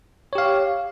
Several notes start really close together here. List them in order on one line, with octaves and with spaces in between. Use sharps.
C#5 G4 F5